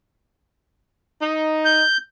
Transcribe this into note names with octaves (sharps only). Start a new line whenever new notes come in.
D#4
G6